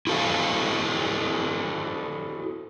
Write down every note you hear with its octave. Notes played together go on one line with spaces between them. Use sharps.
E4 F#4 A4 C5 F5